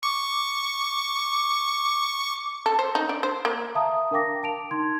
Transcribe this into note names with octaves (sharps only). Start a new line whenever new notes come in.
C#6 D6
A4
C5
D#4
D4
C5
A#3
E5 F5 A5 A#5 D#6
D4 A#4 F5 G5 D6 A#6
A5 D7 F7
D#4 C6 G#6